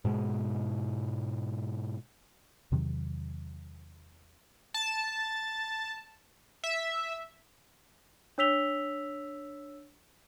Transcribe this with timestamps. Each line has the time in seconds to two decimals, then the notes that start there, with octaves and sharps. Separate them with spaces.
0.05 G#2 B2 G#3
2.72 E2 C3 D#3 F#3
4.74 A5
6.64 E5
8.38 D4 C#5 E6 B6 F7 G7